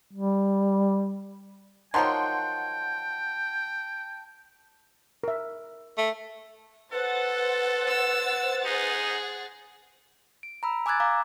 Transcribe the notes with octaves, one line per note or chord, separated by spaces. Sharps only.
G3
D#3 F3 F#3 F#5 G5 A5 C6
A#4 E5
A3
A4 B4 C5 F#5 A6
E6
D#4 G#4
D7
A#5 B5 E6
G#5 D6 E6 F#6 G#6 A6
F5 A#5 D6